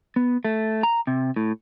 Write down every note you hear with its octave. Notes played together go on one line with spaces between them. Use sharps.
B3
A3
A#5
C3
A2